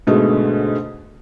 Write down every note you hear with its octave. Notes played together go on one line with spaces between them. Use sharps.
G#2 B2 D3 G#3 A3